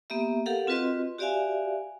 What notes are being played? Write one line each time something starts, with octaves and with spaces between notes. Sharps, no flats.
A#3 B3 G4 E5
G4 A4 A#4 F5 F#5
C4 F4 F#4 B4 D#5 C6
F#4 G4 D5 E5 F5 G#5